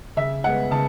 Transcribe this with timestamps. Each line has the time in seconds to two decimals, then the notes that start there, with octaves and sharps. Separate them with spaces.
0.17 C#3 E5
0.44 G#3 B3 F#5
0.71 C#3 A5